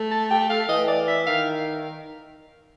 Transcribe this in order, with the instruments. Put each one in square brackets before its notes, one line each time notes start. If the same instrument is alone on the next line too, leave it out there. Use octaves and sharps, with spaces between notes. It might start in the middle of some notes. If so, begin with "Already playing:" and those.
Already playing: [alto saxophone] A3
[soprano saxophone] A5
G5
F5
[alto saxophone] E3 [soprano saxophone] D#5
[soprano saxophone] D5
E5
[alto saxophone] D#3 [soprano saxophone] F5